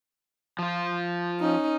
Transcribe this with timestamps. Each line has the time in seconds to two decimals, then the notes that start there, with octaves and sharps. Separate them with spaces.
0.59 F3 F4
1.40 C#4 D#4